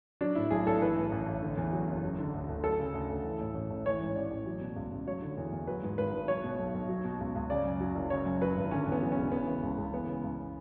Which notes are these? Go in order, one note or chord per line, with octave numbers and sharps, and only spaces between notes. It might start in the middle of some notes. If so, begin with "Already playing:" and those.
F#3 D4
A2 E4
B1 G#4
B1 A4
E3 B4
A2
A1
A1
D3
E2
F#3
F#1
F#3
D3
D2
D2
F#3 A4
C#3
D2
D2
E3
A2
A1
A1
E3 C#5
G#2
A1 D5
A1
F#3
B2
C#2
C#2
F#3 C#5
D3
E2
E2
F#3 B4
G#2
G#1 B4
G#1
F#3 C#5
B2
B1
B1
F#3
B2
C#2
C#2
C#3 D5
F#2
F#3
F#1
C#3 C#5
F#2
F#3 B4
G#1
D3 C#4
E2 B3
F#3
E1 C#4
E3 B3
C#3
C#2
C#2
E3 B3
C#3
C#2